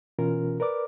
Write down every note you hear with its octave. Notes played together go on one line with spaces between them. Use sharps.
B2 E3 C#4 F4 A#4
A#4 B4 D5 D6